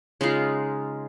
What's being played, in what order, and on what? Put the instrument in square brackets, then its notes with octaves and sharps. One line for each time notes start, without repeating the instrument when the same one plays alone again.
[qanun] C#3 G#3 D#4 F4